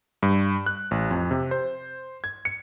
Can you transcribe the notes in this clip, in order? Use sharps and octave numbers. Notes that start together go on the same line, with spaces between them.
G2
F#6
A1
F2
C3
C5
G#6
C#7